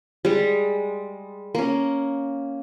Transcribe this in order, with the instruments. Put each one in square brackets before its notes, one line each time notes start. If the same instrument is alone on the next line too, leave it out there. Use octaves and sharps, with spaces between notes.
[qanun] G3 G#3
A#3 C#4